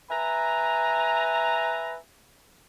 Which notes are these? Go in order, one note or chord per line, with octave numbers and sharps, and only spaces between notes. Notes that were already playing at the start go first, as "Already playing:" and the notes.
B4 E5 G#5 A#5